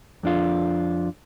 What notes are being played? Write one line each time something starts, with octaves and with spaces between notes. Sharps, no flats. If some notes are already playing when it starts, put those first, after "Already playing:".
F2 D4 F4